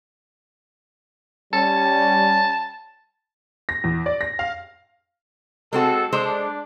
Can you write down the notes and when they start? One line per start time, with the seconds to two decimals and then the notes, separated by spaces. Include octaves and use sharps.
1.53 G3 C#4 A5
3.69 A#6
3.84 E2
4.06 D5
4.21 A#6
4.39 F5
5.73 G#3 C4 F#4 A4
6.13 G#3 D4 A4 C5